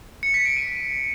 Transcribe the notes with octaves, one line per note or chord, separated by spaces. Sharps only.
C#7
B6
D7
D#7